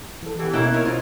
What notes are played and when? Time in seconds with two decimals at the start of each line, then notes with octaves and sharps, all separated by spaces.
0.23 E3 A4
0.39 E3 B3 G4
0.53 B2 A#3 C#4 E4 D#5 F#6
0.73 D#4 A#4 C#5
0.85 F4 C5